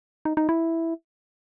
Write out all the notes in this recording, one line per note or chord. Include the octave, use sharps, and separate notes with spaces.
D#4
D#4
E4